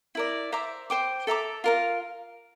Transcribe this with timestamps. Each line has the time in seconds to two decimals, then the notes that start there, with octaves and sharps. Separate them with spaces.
0.15 E4 A#4 D5
0.52 C5 E5 A#5 D6
0.90 C5 G5 D6
1.27 A4 E5 A#5 D6
1.64 F4 A#4 F5